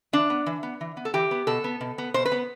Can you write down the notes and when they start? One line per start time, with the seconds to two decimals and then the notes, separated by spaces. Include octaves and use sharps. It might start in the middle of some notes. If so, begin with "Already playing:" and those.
0.13 E3 D4
0.30 B3
0.46 E3
0.63 B3
0.81 E3
0.97 B3
1.05 A4
1.14 E3 G4
1.31 B3
1.47 B2 A4
1.64 B3
1.81 B2
1.98 B3
2.14 B2 C5
2.25 B4
2.32 B3